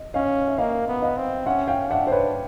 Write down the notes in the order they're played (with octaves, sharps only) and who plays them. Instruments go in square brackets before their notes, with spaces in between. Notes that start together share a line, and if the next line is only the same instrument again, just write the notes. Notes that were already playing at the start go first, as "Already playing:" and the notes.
Already playing: [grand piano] D#5
[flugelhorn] C#4 [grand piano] D#5 F5
[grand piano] E5
[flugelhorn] A#3 [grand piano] D#5 F5
[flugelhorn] B3
[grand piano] D#5 F5
[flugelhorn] C4
[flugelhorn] C#4 [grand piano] E5 F#5
[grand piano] F5 G5
[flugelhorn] D4 [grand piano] E5 F#5
[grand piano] C5
B4 C#5